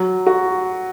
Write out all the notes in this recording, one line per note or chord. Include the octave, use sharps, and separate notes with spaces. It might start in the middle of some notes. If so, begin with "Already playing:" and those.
Already playing: F#3
F#4